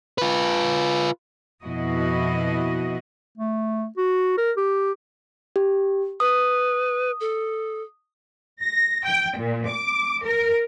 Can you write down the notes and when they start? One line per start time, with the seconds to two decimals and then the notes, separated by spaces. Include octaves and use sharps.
0.18 F4 B4
1.64 F2 B2 E4 F#4 D#5
3.38 A3
3.97 F#4
4.38 A#4
4.57 G4
5.56 G4
6.20 B4 D#6
7.21 A4
8.63 A#6
9.05 G5
9.38 A#2
9.69 D6
10.25 A#4